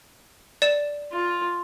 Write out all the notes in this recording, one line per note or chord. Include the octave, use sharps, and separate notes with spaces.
D5 E7
F4